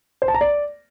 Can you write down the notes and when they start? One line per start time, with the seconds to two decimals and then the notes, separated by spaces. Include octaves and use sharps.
0.22 C5
0.28 A5
0.34 A#5
0.41 D5